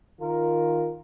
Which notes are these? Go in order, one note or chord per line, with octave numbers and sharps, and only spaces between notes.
D#3 F4 A#4